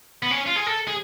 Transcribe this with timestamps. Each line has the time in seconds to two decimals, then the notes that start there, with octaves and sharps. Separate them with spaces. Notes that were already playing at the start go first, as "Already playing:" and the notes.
0.23 B3
0.31 C#4
0.47 F4
0.56 G#4
0.66 A4
0.88 G#4